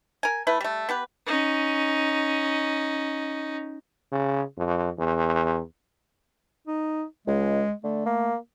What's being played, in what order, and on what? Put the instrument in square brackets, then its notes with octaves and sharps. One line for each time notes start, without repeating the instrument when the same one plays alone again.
[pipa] A#4 G#5
A3 E4 B4
G3 A3
B3 G4 B4
[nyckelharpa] C#4 D#4
[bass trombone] C#3
F2
E2
[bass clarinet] D#4
[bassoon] C#2 [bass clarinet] G#3
[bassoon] D3 [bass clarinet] A3
[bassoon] A#3